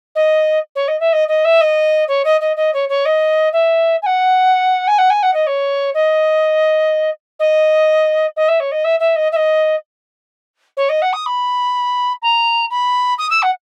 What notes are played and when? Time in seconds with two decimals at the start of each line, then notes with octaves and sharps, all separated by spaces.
0.15 D#5
0.75 C#5
0.88 D#5
1.00 E5
1.13 D#5
1.28 D#5
1.45 E5
1.61 D#5
2.08 C#5
2.25 D#5
2.41 D#5
2.56 D#5
2.73 C#5
2.89 C#5
3.05 D#5
3.53 E5
4.02 G#5
4.06 F#5
4.87 G#5
4.98 F#5
5.10 G#5
5.23 F#5
5.34 D#5
5.47 C#5
5.94 D#5
7.39 D#5
8.36 D#5
8.48 E5
8.60 C#5
8.71 D#5
8.84 E5
9.00 E5
9.16 D#5
9.32 E5
9.36 D#5
10.77 C#5
10.89 D#5
11.02 F#5
11.13 D#6
11.26 B5
12.22 A#5
12.70 B5
13.18 D#6
13.30 E6
13.42 F#5